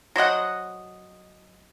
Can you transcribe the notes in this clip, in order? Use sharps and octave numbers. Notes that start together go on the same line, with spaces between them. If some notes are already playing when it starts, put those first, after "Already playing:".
F#3 C5 D#5 F#5